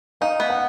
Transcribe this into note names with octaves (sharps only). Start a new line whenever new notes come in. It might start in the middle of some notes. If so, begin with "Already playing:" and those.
D#4 F5
B3
F#5